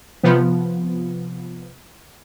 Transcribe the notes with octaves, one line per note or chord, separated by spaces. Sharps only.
C3 F3 B3